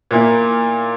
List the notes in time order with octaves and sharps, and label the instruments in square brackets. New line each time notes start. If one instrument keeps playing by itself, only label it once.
[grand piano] A#2 A#3 E4